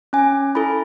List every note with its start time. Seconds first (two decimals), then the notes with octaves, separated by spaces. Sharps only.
0.13 C#4 G#5
0.55 E4 A4 B5